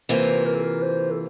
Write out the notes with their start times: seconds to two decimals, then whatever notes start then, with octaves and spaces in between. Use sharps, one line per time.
0.09 C3 E3 A#3 F4 C5
0.46 A#4
0.55 A4
0.63 A#4
0.82 C5
1.11 A4